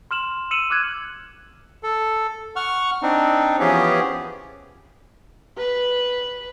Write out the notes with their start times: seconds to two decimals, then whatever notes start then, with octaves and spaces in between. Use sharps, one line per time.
0.11 C6 F6 E7 F#7
0.51 E6 C#7 D#7 E7 F#7
0.70 D6 F6 F#6 G#6
1.83 A4
2.56 F#5 C#6 F6
3.02 C4 D4 D#4
3.60 E3 F3 B3 C#4 G4 G#4
5.57 B4